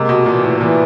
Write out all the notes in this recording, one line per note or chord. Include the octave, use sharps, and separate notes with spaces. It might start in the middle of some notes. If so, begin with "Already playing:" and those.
Already playing: C3 G#3 A#3
B2
A#2 E3
A2
A#2 E3